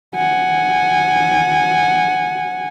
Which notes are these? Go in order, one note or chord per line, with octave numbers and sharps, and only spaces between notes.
F#5 G#5